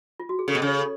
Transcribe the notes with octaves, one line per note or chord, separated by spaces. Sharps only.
F4
F#4
G#4
C#3 A4
B2
C#3
C#5
A4